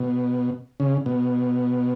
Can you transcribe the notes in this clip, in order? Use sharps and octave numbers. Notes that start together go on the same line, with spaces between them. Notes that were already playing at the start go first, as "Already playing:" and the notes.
Already playing: B2
C#3
B2